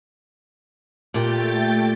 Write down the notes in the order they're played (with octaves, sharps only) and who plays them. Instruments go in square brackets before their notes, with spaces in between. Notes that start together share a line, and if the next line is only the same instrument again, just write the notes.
[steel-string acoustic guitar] A#2 G4 [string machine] A3 G5 A6